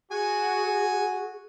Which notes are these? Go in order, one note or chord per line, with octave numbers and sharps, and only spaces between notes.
F#4 G#4 G#5